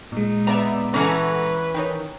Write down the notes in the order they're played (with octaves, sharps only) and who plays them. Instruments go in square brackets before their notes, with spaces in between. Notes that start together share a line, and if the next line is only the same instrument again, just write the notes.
[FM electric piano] A#2 G#3 [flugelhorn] D#4
[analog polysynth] B3 D5 E5 [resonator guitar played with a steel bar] A#5
[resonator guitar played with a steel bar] E3 C#4 [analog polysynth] A4 F#5 A#5 [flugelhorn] B4
[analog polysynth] D#3 D#4 [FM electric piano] C#5 G5